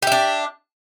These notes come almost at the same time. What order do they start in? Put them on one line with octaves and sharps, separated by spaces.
G4 E5 D4